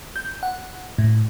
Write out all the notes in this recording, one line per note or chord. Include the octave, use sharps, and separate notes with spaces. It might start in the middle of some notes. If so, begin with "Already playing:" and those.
G6
F#5
A2